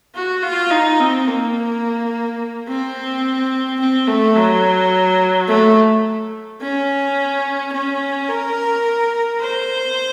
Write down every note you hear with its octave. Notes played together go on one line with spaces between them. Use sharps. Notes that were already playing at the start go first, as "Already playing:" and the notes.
F#4
F4
D#4
C4
A#3
C4
C4
A3
F#3
A3
C#4
C#4
A#4
C5